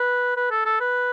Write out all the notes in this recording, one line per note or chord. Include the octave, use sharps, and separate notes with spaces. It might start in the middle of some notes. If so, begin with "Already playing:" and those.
Already playing: B4
B4
A4
A4
B4